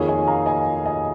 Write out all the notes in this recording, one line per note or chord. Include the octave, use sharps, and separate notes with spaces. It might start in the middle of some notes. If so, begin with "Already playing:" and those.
Already playing: F2 D#3 A#3 G#4 C#5
D#5 G#5
F5 A#5
D#5 G#5
D#5 G#5